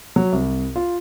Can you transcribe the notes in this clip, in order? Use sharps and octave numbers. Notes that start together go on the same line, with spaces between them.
F#3
C2
F4